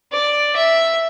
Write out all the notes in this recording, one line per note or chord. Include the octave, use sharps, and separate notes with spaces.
D5
E5